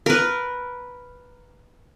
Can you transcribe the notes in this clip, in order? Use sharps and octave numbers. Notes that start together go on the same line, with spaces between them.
A#4 B4